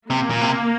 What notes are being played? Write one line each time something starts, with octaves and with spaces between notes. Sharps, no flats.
C3 A#3
A#2
C3